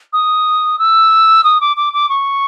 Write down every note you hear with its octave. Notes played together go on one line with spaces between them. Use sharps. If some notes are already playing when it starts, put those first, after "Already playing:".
D#6
E6
D#6
D6
D6
D6
C#6